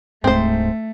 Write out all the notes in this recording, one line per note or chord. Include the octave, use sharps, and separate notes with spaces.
D1 G#2 A3 C4 C5